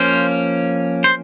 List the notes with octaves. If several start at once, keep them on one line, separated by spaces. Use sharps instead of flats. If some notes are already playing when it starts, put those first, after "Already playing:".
Already playing: F3 A#3 C#4 C5
C5